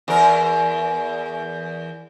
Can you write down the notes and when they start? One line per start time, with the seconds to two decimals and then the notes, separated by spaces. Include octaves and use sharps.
0.08 E2 A#4